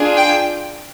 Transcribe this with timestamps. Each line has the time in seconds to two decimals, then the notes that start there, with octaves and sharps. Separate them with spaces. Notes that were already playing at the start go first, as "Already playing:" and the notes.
Already playing: D4 F4 G#4
0.17 G5